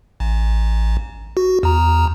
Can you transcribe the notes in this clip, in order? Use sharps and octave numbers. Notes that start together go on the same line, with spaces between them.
A1
F#4
E2 A#5